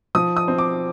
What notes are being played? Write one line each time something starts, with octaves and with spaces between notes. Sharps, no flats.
F3 D#6
D#6
C4
D6